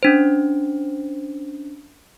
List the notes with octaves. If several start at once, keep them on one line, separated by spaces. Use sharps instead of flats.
C#4 D4 C5